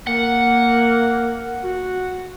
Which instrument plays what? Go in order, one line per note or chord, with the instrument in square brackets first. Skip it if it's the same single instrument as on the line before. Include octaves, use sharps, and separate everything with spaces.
[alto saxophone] A#3 [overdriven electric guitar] F#5
[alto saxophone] F#4